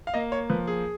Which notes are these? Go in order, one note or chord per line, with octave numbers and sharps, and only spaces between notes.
F5
A#3 D#5
C#5
F3 B4
G#4